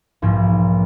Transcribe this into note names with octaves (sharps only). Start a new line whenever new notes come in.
B1 G#2 F3 A#3